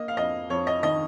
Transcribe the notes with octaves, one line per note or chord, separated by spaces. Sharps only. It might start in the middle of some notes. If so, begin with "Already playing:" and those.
Already playing: A#3 D#5
F5
F2 D#5
F2 C#5
D#5
D#3 D#5